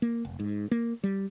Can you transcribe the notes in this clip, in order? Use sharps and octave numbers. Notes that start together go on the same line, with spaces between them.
A#3
F1
G#2
A#3
G3